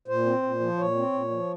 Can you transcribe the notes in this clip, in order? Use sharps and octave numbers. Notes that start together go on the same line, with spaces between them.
A#2 C5
C4
A#2
F3
A#2 C#5
C4
A#2
F3